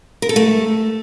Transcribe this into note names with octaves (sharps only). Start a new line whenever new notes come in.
A#4
A4
A3